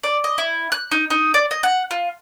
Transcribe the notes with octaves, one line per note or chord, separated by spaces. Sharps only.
D5
D#5
E4
F#6
D#4
D#4
D5
D#5
F#5
F4